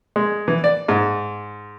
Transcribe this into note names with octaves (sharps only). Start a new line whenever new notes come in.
G#3
E3
D5
G#2